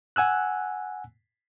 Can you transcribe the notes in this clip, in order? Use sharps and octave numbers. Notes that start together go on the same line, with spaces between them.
F#5 G#5 E6 F#6